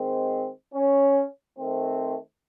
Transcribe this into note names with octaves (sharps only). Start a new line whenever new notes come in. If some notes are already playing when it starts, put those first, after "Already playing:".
Already playing: D#3 G#3 C4
C#4
D#3 A3 C4